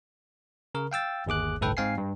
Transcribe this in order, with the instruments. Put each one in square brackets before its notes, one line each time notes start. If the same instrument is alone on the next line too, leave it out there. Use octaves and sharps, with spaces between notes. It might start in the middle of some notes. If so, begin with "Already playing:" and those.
[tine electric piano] C#3 A#4
F5 G5 E6 A6
G1 D#2 G#4 D6 F#6
G1 C2 A2 A4 B4 G5
G#2 C4 F5 G#5 C7
G2